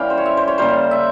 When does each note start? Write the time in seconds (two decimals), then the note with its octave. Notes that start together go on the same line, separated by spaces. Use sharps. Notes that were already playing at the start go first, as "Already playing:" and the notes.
Already playing: E3 G3 C#4 F5 G5
0.10 C5
0.18 C#5
0.26 E5
0.37 C5
0.48 C#5
0.58 C#3 G3 A#3 C5
0.91 E5